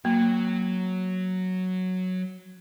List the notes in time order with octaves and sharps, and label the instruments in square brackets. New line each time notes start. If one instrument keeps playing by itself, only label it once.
[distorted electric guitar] F#3 [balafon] A#3